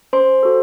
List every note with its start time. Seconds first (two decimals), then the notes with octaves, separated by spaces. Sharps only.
0.13 C#4 C5 C6
0.43 F#4 A4